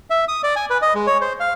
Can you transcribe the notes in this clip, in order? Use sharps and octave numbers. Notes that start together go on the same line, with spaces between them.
E5
D#6
D5
G#5
B4
D#5
G#3
C#5
C5
F5